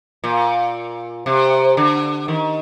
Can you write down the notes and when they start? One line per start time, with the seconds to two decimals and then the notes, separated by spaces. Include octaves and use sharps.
0.24 A#2
1.26 C3
1.77 D3
2.28 D#3